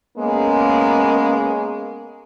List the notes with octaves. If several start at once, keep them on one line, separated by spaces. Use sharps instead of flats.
G#3 A#3 B3 C#4